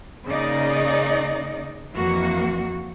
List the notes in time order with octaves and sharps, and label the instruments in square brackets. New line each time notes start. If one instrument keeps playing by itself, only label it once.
[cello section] C#3 A#3 D#4 D5 D#5
F2 E3 A#3 F#4